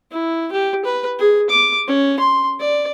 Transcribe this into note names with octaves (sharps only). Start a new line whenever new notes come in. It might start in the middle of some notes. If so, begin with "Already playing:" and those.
E4
G4
B4
G#4
D6
C#4
C6
D5